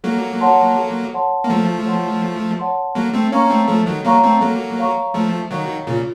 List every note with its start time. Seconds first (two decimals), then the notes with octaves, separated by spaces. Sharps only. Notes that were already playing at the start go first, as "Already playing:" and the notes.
0.04 F#3 A#3 A4
0.41 C#5 F#5 A5 C6
0.77 A4
1.14 C#5 F#5 A5 C6
1.44 A#3
1.50 F3 A3 A4
1.86 C#5 F#5 A5 C6
2.23 A4
2.59 C#5 F#5 A5 C6
2.95 F#3 A#3 A4
3.13 A3 C4
3.32 A#3 C#4 C#5 F5 A#5 C#6
3.46 C#4
3.50 A3 C4
3.68 F3 A3 A4
3.86 D#3 F#3
4.05 F#3 A#3 C#5 F5 A#5 C#6
4.23 A3 C4
4.41 F#3 A#3 A4
4.78 C#5 F5 A#5 C#6
5.14 F3 A3 A4
5.51 D#3 F#3 C#5 F5 A#5 C#6
5.87 A#2 C#3 F4